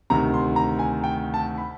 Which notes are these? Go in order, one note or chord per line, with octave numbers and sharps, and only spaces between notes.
D2 C3 D#3 A#5
C6
A#5
G#5
G5
A5
B5